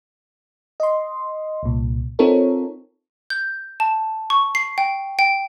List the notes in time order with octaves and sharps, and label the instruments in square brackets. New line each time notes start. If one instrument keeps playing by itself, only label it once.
[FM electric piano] D#5 C6
C2 A#2
C4 D#4 F4 A4 A#4 C#5
[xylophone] G6
A5
C#6
C7
G5
G5